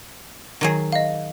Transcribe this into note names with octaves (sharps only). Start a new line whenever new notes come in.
D#3 F#3 G#4
D#5 F5